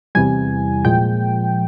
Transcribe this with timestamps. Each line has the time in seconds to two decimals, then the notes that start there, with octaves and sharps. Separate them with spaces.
0.15 E2 C3 E3 G3 G#5
0.85 A#2 F3 G#3 G5